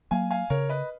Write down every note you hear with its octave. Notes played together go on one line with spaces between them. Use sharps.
F#3 A#3 F5 G#5
F5 G#5
C#3 A#4 C#5
B4 D#5